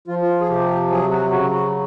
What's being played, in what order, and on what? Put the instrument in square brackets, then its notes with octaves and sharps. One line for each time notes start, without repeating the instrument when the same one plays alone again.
[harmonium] F3 F4
F4
G#4
C3 G4
F#3 G#4
F#4
C#3 F#4
F#4